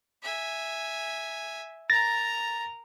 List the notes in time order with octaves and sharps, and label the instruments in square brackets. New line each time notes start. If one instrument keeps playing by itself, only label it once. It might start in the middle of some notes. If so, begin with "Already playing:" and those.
[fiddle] E5 G#5
[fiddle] A#4 A#5 [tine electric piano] A6 A#6